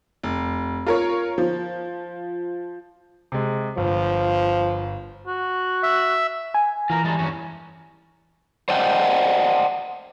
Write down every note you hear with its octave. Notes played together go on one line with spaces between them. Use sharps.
F1
F4 A#4 C#5
F3
C3 G#3
G1 F3
F#4
E5
G#5
E3 F4 A#4
G3 G#3 A4
E2 G2 C#4
C5 D5 D#5 F#5 G5